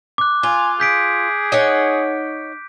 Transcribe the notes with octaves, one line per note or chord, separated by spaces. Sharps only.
D6 F#6
F4 G#5
G#4 G6 B6 D7
D#4 C#5 F#5